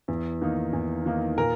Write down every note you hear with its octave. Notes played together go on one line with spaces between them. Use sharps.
E2
D#3 A#3 D#4
E2
D#3 A#3 D#4
A#2 A#4